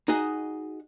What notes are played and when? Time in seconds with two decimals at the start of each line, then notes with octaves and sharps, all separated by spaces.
0.08 D#4 F#4 G#4 D#5